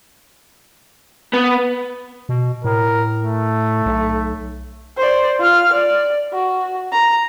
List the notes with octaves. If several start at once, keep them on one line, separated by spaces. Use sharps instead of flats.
B3
B2
A2 A#4
A3
B1
C5 D5
F4 F6
D5
F#4
A#5